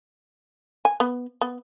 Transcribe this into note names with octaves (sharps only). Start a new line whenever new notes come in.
G#5
B3
B3